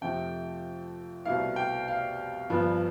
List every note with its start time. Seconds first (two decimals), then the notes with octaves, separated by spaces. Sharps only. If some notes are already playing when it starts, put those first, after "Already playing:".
0.01 F2 C3 F3 A3 G5
1.25 C2 B2 A3 E4 F5
1.56 G5
1.88 F5
2.50 G1 G2 F3 B3